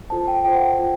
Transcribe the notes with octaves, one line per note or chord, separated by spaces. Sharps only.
F4 A4 C5 A5
G5
F4 A4 C5 G5
F#5
G5
F4 A4